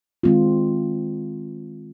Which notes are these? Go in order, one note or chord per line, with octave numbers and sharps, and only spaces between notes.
D#3 G#3 C4 F4